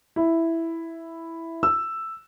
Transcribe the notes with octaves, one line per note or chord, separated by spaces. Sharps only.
E4
E6